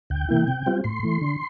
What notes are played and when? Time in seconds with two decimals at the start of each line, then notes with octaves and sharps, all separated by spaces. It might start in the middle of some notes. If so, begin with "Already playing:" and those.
0.10 D2 G5
0.28 C3 E3 A#3 E4
0.48 C3
0.66 G3 C4 F4
0.84 A2 C6
1.03 E3 A3
1.21 D3